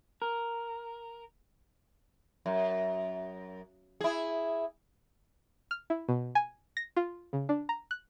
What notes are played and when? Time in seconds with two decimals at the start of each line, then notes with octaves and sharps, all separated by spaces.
0.22 A#4
2.46 F#2
4.01 E4 G#4
5.71 F6
5.90 E4
6.09 B2
6.35 G#5
6.77 A#6
6.96 F4
7.33 C#3
7.49 D4
7.69 A#5
7.91 F#6